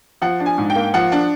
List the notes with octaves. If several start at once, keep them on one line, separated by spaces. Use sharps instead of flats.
F3 F#5
D4
G#5
G#2
G5
A#3
F3 F#5
D4